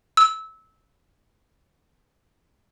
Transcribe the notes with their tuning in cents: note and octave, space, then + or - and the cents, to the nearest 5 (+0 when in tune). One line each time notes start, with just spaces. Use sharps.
E6 -20